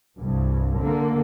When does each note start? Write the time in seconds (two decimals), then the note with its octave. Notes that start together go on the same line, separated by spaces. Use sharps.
0.16 C2 G2
0.80 D3 A#3